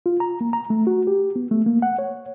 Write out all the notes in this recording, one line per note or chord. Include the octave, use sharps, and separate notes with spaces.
F4
A#5
A#3
A#5
A3
F#4
G4
B3
A3
A#3
F#5
C#5